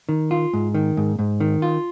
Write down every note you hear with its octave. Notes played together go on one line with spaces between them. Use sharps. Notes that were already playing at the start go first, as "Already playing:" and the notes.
D#3
F4
G#2
D#3
G#2
G#2
D#3
F4